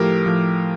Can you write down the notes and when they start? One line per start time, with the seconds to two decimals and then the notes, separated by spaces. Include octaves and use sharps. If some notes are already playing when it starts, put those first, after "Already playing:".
Already playing: A2 F3 G4 A#4
0.26 A2 F3